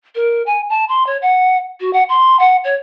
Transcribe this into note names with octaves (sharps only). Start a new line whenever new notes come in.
A#4
G#5
A5
C6
C#5
F#5
F#4
F#5
C6
F#5
C#5